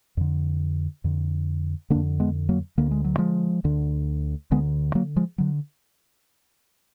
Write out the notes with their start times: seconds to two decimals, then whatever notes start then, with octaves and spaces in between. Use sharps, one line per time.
0.17 F2 D3
1.04 F2 D3
1.90 D3 A#3 D4
1.95 F2
2.20 G#3 B3
2.49 F#3 A#3
2.78 D2 D3 A#3
2.91 G#3
3.05 F#3
3.18 F3 G#3
3.64 D2 D3
4.51 D2 D3 G#3 B3
4.95 F#3 A#3
5.16 F3 G#3
5.38 D3 F#3